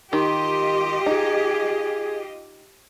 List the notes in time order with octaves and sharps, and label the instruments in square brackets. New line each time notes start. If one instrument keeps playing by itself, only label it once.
[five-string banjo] D#3 [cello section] F4 G4 D#5 [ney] C6
[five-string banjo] D#4 [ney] G#4